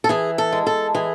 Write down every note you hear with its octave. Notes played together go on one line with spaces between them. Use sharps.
A4
E3 G#4
A4
G#3
A4
E3 G#4